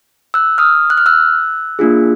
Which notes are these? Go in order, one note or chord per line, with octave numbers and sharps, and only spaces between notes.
E6 F#6
D#6 F6
F#6
F6
E6 F#6
A#3 D4 F4 G#4